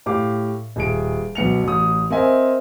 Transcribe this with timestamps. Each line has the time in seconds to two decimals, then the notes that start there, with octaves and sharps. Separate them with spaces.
0.06 A2 G4 F5 D6
0.76 D#1 G#4 D7
1.35 B1 B3 C#7 F7
1.63 A1 D#6
2.10 C4 A#4 D#5 E5 G#5